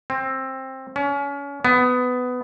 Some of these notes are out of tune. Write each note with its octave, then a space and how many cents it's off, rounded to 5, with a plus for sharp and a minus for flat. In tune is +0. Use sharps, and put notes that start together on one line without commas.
C4 +15
C#4 +30
B3 +15